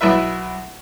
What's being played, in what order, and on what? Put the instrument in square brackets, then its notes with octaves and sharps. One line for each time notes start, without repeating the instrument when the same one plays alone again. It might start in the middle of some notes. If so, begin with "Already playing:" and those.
[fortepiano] B1 E4 B4 E5